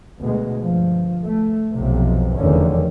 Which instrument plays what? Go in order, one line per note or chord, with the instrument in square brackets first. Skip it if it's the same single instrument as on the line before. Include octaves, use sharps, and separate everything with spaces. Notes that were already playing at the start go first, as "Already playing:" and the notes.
[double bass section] D2 B2 G#3
G2 F3
A3
B1 F2 C3
F1 E2 D3 D#3 C#4